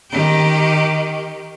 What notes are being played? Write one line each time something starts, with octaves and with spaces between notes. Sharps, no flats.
D#3 G4